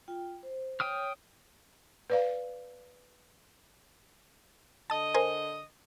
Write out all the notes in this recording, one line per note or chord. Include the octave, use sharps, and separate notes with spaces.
F4 G5
C5
C#5 G5 D#6 F6
B4 D5 F5
D3 D#5 A5 D#6
A#4 C5 G#5